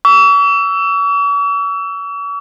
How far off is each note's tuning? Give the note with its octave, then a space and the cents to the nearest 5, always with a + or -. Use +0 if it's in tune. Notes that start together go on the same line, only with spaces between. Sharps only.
C#6 +45 E6 +0